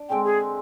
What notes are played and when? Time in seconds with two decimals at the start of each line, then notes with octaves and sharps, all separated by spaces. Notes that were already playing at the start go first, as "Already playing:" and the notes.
Already playing: D4
0.09 D3 G#3 C4 G5
0.25 G#4